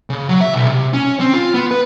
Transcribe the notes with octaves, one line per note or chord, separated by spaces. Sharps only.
C#3
F#3
E5
B1
C3
C#4
C4
F4
B3
B4